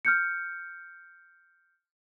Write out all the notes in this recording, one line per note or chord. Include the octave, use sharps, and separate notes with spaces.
F6 G6 C#7